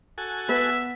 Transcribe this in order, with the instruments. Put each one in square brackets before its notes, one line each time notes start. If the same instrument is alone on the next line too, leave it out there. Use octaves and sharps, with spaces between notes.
[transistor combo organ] F#4 A4 G#5
[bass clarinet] B3 [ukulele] B4 [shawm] E5